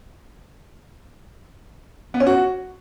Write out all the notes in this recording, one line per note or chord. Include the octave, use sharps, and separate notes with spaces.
B3
C#4
F#4